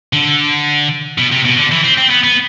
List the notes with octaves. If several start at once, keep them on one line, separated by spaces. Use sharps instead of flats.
D3
B2
C3
B2
D3
E3
C4
C4
B3
B3